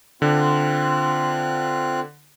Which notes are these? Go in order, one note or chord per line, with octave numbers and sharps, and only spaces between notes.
D3 C4 F4 F#6